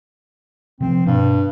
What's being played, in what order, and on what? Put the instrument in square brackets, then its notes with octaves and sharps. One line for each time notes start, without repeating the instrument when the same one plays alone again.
[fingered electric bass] C3 F3 [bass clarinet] C4
[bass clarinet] G2 [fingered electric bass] B2